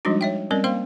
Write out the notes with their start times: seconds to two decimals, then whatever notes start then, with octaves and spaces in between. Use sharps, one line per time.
0.05 F3 G3 G#3 D4 D#4 F#4
0.21 C#5 E5 G5
0.51 G3 C4 C#4 A#4 D5
0.64 A#3 C5 F5 G5 C6